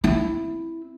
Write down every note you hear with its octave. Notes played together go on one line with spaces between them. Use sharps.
C4 E4